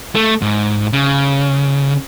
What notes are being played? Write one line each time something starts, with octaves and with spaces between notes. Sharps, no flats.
A3
G#2
C#3